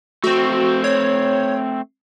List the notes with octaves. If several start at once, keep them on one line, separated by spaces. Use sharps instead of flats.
A3 C4 F#4
C#5